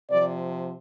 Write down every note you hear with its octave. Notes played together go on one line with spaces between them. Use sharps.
C3 F3 D5